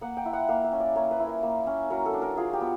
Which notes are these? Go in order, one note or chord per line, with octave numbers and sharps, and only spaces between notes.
A#3 F#5
G5
E4
F#5
A#3 F5
E5
C#4
D5
A#3 C#5
B4
E4
A#4
A#3
C#4
F#3 A#4
A4
D4
A#4
F4 G#4
G4
B3